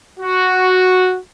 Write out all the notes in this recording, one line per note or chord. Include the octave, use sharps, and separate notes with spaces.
F#4